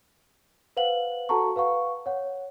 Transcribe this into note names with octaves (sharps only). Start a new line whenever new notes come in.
B4 C5 F5 F#5 F#7
F#4 A4 F#5 A5 A#5 C#6
B4 F5 F#5 C#6
C#5 F#5